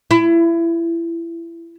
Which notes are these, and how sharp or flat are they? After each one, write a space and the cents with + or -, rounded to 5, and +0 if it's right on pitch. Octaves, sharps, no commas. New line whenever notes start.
E4 +25